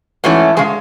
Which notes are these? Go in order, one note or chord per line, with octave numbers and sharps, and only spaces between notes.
G#2 E3 A3 C#4 F#4
C#3 G#3 G#4